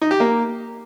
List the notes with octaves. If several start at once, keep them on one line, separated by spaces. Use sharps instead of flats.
D#4
G4
A#3